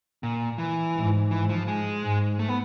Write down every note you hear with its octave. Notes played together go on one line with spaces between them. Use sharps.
A#2
E3
G#2
E3
F3
G#3
G#2
A3
B3